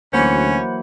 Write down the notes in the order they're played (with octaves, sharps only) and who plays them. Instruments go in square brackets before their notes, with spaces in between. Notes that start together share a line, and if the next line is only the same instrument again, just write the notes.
[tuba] D2 [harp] E3 F#3 A#3 [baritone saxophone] C#4 [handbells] C5 F#5 B5